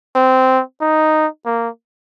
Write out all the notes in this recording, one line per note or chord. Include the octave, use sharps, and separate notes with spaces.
C4
D#4
A#3